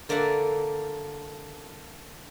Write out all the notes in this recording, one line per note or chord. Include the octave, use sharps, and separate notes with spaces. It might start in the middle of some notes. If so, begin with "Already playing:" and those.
D3 A#3 D5 E5 F#5